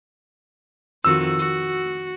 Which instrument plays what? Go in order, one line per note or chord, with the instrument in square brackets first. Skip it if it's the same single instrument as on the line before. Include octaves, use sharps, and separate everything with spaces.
[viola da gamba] F2 D#3 F#4 [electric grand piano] E6
[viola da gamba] F#4